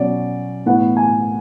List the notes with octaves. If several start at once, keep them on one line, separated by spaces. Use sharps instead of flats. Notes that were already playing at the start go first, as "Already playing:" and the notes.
Already playing: B2 F#3 C#4 D5
A2 E3 B3 F#5
G#5